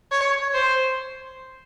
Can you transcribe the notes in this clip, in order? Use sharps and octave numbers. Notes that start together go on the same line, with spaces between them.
C#5
C5